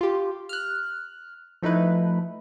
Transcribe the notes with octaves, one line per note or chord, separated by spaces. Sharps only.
F4 G4
F6 F#6
F3 A3 D#4 E4 B4